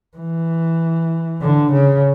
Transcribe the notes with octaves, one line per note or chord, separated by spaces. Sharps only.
E3
D3
C#3